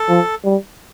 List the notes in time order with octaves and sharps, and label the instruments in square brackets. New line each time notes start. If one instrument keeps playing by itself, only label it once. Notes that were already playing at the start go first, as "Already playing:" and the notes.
Already playing: [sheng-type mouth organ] A4
[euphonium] F3
G3